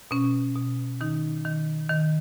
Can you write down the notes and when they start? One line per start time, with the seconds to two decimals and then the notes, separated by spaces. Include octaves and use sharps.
0.11 B2 C#4
0.56 B2
1.01 D#3 D#4
1.45 D#3
1.89 D#3